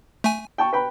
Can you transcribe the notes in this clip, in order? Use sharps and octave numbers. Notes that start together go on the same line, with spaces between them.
A3 G#5
G5 A5 C#6
B4 G5 B5